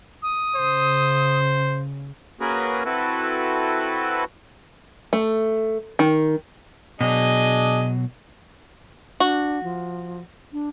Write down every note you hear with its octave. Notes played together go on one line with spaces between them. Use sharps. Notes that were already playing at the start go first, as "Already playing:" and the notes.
D#6
C#3 C5
A#3 C#4 F#4 G#4 A#4 B4
C4 E4 F#4 A4 B4
A3
D#3
B2 F#3 D4 G#4 D#5
D4 F#4
F3
D4